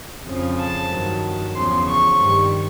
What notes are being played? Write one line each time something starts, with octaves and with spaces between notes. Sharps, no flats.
F2 C#3 F3
A5
G2 D#3 F#3
E2 C#3 F3 C6
C#6
G2 D#3 G3